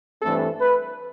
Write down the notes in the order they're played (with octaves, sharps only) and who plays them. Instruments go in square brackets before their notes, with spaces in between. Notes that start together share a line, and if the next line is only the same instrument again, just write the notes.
[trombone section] G2 E3 A3 C4 A4
B4